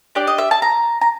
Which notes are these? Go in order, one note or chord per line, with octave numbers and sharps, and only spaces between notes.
D4 G4 D5
D#5
E5
A5
A#5
A#5